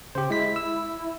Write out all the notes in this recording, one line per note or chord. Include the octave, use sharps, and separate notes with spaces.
C#3 G4 C5
G#3 E4 B6
E6